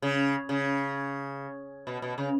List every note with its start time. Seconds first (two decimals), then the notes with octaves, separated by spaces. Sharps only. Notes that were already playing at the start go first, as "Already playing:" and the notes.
0.02 C#3
0.49 C#3
1.87 B2
2.02 B2
2.18 C#3